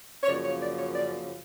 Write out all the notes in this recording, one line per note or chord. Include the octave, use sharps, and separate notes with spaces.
C#5
F#2 C#3 F3 A#3 D5
C#5
D5
C#5
D5